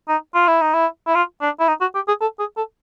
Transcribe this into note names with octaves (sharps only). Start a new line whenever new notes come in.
D#4
F4
E4
D#4
E4
E4
F4
D4
E4
D#4
F#4
G4
G#4
A4
G#4
A4